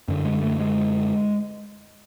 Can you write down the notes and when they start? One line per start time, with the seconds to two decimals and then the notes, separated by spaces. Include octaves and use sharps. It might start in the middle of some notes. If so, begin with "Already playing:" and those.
0.08 F#2 D3
0.25 G#3
0.42 A3
0.60 G#3